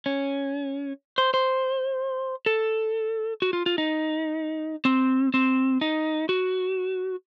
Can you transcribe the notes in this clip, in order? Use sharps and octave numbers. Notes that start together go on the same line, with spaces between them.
C#4
C5
C5
A4
F#4
F4
F4
D#4
C4
C4
D#4
F#4